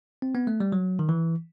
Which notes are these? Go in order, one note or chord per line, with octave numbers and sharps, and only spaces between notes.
C4
B3
A3
G3
F#3
D#3
E3